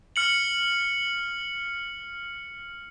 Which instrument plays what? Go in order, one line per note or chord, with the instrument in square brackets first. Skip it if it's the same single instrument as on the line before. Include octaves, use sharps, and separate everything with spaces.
[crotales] F6 C#7 F#7